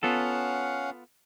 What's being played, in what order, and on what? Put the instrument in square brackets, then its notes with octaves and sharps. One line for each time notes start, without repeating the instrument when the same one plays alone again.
[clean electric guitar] B3 F4 A4 [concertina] C#4 F5 F#5